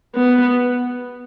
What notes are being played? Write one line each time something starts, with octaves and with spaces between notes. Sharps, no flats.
B3